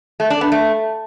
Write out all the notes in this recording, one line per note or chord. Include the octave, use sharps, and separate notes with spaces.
A3
D4
B3
A3